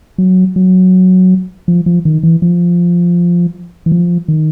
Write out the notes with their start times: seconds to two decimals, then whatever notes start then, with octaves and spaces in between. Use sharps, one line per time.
0.18 F#3
0.56 F#3
1.68 F3
1.86 F3
2.05 D#3
2.23 E3
2.42 F3
3.86 E3
3.92 F3
4.28 D#3